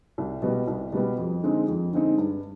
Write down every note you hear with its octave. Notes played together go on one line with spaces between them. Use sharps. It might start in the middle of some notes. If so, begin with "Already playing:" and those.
C2
B2 G3 B3
C2
B2 G3 B3
F2
D3 G#3 C4 D#4
F2
D3 G#3 C4 D#4
G2